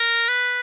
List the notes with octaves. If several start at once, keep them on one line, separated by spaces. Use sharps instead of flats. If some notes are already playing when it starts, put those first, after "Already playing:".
Already playing: A#4
B4